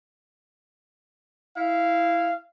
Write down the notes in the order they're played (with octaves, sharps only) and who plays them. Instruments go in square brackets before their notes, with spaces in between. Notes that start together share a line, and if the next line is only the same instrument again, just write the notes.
[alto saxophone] E4 [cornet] F5